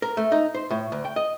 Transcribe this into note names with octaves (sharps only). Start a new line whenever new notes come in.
A#4
A3
D#4
C5
A2
D2
G5
D#5